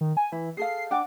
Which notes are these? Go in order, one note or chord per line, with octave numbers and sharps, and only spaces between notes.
D#3
G#5
E3 E4
G#4 A4 F5 C7
D4 F#5 G5 D6